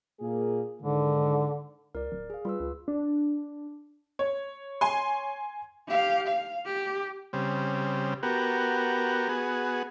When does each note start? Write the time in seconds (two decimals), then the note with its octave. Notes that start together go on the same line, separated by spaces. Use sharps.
0.20 A#2 A#3 G#4
0.82 G#2 D3 D#3
1.95 C#2 A#4 D5
2.12 D1
2.30 G#4 F5
2.45 G3 F4 B4 E6
2.60 C#2
2.88 D4
4.19 C#5
4.81 G#5 C6
5.89 G4 F5
6.28 F5
6.66 G4
7.33 C#3 G3 C4
8.23 B3 F#4 G4 A#4
9.29 B3 F#4 G#4